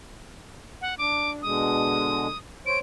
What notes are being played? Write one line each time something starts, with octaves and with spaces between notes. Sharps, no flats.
F#5
D4 D6
B2 D3 G#3 D#6
C5 C#5 D7